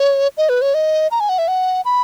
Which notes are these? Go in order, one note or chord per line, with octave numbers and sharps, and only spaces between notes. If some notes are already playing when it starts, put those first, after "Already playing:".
Already playing: C#5
D#5
B4
C#5
D#5
A#5
G#5
F#5
E5
F#5
B5